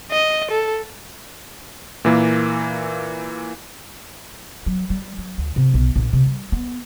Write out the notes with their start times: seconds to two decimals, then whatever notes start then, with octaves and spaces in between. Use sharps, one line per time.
0.11 D#5
0.51 A4
2.05 A#2 E3 A#3
4.66 F#3
4.90 G3
5.18 F#3
5.38 D2
5.56 C3
5.74 B1
5.96 A#1
6.13 C3
6.26 G3
6.52 B3